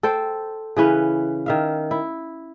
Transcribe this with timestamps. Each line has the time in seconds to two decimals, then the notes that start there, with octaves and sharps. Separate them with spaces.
0.03 A4 C5 G5
0.77 C#3 E3 C#4 B4
1.46 D#3 E5 F5
1.91 E4